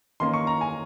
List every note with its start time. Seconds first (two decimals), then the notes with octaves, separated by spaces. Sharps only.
0.20 D#3 A#3 C#4 C6
0.34 C#6
0.47 A#5
0.61 G#5